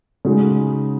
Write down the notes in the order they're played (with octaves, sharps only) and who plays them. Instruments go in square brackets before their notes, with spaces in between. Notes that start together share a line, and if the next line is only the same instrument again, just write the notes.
[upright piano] C#3 G#3 D#4 F#4